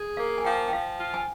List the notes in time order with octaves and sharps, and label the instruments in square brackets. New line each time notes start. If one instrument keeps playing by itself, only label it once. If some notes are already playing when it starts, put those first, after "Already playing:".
Already playing: [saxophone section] G#4
[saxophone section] A#3 [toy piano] F5
[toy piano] G#5
[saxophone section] F3 [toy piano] G5
[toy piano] G5
[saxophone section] F3 [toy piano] F5
[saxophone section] F4
[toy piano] G#5